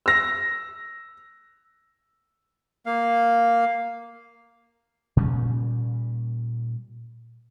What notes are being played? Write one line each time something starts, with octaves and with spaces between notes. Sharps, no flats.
E6 A#6
A#3 F5
A#2 G3 C#4